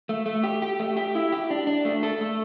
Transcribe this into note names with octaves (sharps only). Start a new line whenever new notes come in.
A3
A3
G4
G4
A3
G4
E4
G4
D4
D4
A3
A4
A3